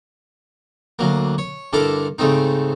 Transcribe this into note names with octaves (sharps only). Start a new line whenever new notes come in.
D2 F#3 A#3
C#5
G2 D3 E4 A4 A#4 D6
G#2 C#3 A3 C4 D#4